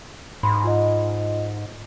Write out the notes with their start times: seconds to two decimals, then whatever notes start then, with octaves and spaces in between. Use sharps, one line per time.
0.43 G#2 B5 C6
0.64 F4 D#5